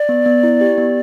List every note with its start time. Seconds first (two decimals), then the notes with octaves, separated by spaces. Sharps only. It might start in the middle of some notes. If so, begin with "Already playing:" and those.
Already playing: D5
0.09 B3
0.26 B3
0.43 E4
0.61 G4
0.78 B3